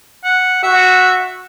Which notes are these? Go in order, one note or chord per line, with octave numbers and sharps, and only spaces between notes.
F#5
F#4 E5